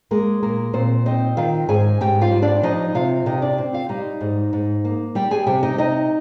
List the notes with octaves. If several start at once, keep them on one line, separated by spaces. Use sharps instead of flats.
G#3 A#3 A#4
A#2 A#3 A#4
A#2 C4 C5
C4 D#4 D#5
D#3 F4 F5
G#2 G#4 G#5
G#2 G4 G5
F4 F5
G3
D4 D5
F3 D#4 D#5
C3 F4 F5
C3 D#4 D#5
D4 D5
C4
F4 F5
G3 D#4 D#5
G#2
G#2
A#3
G3 G4 G5
G#4 G#5
C3 G4 G5
D#4 D#5
C3 D#4 D#5